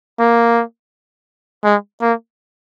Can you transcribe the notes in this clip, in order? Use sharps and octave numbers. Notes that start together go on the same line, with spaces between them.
A#3
G#3
A#3